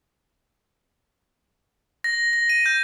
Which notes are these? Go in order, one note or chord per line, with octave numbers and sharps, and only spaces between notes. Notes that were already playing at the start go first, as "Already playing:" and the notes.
A#6
A#6
D#7
G6